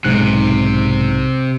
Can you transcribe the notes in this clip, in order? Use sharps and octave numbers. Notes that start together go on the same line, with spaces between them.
B1 G#2 C3 F#6